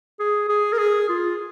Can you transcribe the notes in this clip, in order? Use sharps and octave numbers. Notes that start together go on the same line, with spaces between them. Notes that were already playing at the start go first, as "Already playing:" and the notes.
G#4
G#4
A#4
G#4
F4